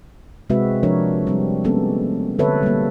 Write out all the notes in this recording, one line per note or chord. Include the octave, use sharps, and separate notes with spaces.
C3 G#3 C4 F#4 B4 E5
F3 D4 A#4 C#5
G3 C4
G#3 A#3 B3 C#4 G4 A4
D3 C4 A4 B4 C#5 E5
G3 A#3